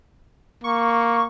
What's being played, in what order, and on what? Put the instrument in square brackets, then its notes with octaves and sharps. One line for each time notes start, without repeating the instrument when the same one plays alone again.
[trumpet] A#3 [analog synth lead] C#6